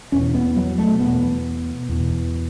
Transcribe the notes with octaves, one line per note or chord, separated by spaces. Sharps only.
E2 B2 C#4
B3
F#3
A3
E2 B2 B3
E2 B2